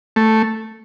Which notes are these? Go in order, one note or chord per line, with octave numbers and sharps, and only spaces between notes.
A3